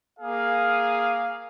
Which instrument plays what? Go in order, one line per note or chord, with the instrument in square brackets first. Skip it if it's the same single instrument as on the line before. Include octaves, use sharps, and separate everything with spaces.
[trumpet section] A#3 G#4 F5